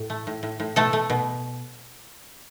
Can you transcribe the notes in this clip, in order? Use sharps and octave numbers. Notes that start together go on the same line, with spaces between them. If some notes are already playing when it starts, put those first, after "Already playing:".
Already playing: A2
A3
A2
A2
A2
B2 A3 A4
A3
B2